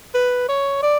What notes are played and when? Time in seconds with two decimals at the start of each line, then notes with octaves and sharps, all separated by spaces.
0.14 B4
0.49 C#5
0.83 D5